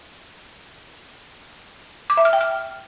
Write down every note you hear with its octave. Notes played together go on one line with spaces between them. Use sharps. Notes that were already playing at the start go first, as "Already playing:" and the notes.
D6
E5
F6
G5
F6